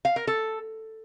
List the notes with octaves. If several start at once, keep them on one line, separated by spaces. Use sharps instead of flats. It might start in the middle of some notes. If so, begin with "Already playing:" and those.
F5
A#4
A4